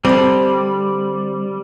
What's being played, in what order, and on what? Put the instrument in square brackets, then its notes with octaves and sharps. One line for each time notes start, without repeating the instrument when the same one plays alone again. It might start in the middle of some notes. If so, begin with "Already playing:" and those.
[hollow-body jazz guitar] D3 C4 [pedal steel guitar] G3